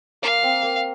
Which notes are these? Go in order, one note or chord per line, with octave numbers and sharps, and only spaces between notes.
A#3 F5
C4
A#3